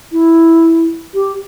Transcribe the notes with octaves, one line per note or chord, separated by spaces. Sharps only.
E4
G4